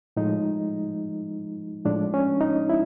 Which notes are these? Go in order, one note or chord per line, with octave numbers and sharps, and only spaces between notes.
A2 F3 G#3 D#4
A2 F3 G#3 D4
C#4
D#4
E4